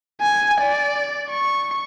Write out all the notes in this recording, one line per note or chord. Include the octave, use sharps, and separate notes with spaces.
G#5
D5
C#6